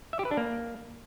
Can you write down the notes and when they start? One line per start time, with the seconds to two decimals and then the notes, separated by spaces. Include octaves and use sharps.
0.13 E5
0.19 G4
0.25 B4
0.31 D4
0.37 A#3